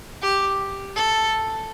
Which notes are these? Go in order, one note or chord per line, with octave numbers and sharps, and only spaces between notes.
G4
A4